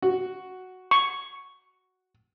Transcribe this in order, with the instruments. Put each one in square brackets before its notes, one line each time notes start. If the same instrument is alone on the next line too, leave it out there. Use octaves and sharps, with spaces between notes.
[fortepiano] F#4
[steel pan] C#6